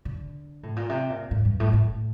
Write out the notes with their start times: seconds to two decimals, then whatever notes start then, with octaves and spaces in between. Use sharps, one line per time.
0.05 D3
0.63 A2
0.76 A#2
0.89 C3
1.10 A#2
1.31 A2
1.45 G2
1.60 A2
1.73 A2